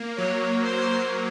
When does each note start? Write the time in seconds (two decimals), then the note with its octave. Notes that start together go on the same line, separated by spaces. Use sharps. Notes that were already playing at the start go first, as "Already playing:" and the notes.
Already playing: A#3
0.18 F#3 C#5
0.64 C5